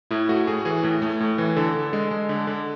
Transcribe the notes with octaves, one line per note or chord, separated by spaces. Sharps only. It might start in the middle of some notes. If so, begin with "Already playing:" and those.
A2 E4
A3 F#4
A2 G#4
E3 G#4
A2
A3
A2
E3
D3 A4
D3
G#3
G#3
D3
D3